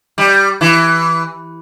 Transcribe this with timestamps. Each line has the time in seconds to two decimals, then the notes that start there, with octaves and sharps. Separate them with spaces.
0.18 G3
0.61 E3